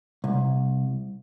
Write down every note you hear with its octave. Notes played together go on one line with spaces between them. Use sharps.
C2